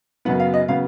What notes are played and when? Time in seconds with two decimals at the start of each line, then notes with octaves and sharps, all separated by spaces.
0.25 F#2 C#3 F#3 B3 F#5
0.40 F5
0.54 D#5
0.68 C#3 F#3 B3 F5